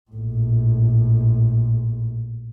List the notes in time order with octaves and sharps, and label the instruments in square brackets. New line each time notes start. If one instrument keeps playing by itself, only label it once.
[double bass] A#1 A2